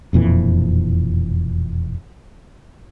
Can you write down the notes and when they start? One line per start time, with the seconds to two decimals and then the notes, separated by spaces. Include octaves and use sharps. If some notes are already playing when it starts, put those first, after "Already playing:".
0.13 E1 F2 A#2 E3